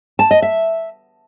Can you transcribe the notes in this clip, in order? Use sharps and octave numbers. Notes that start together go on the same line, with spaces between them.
A5
D#5
E5